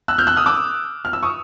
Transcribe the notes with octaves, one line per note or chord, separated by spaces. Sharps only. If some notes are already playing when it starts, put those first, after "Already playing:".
E6 F#6
F6 G6
E6 F#6
D#6 F6
D6 E6
F6
E6
C#6 D#6